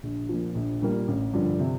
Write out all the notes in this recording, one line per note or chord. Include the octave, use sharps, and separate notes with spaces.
A#1
A#2 F3
A#1
A#2 G3 A#3
A1
G2 D3 F3
C3